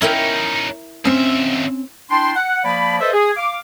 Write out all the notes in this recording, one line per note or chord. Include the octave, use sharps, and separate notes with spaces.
C#4 D#4 E4 A#4 G5
D#2 C4 C#4 E5
D4 E4 G5 A5 C6
F#5
F3 A#3 D5 B5
A4 B4 C5 D#5 E5
G#4
F5 D6